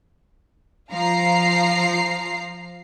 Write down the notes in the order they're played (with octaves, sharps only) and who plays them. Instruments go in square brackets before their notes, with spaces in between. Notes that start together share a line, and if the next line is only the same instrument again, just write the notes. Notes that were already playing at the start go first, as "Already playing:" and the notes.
[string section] F3 F5 A#5 C7